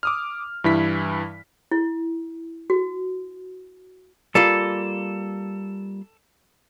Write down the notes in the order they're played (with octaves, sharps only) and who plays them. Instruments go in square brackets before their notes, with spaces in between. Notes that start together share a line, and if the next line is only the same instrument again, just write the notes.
[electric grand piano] D6 D#6 F6
G2 E3 E4 B6
[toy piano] E4
F#4
[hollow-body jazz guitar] G3 A#3 F4 [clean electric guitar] A4